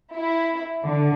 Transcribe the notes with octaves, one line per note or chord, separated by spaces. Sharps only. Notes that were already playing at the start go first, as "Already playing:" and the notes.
E4
D3